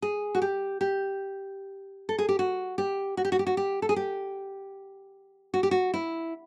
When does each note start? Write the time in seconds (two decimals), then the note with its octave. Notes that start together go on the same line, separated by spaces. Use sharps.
0.02 G#4
0.35 F#4
0.42 G4
0.81 G4
2.09 A4
2.19 G#4
2.29 G4
2.39 F#4
2.78 G4
3.17 F#4
3.25 G4
3.32 F#4
3.39 G4
3.47 F#4
3.57 G4
3.82 A4
3.89 G#4
3.96 G4
5.54 F#4
5.63 G4
5.71 F#4
5.94 E4